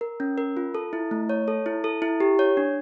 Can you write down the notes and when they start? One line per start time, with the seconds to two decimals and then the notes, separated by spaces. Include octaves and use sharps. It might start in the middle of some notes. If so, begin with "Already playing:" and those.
0.01 A#4
0.20 C#4
0.38 A#4
0.57 F4
0.75 A4
0.93 E4
1.11 A3
1.29 C#5
1.48 A4
1.66 E4
1.84 A4
2.02 E4
2.20 G4
2.39 C#5
2.57 D4